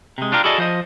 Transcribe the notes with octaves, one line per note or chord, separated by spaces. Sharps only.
C3 G#3
D4 F4 G4 A#4
E4 F#4 G#4 A4 D5 D#5
F3 C5 D#5